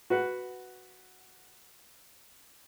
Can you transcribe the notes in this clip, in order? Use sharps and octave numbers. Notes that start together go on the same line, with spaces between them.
F#4 B4 F#5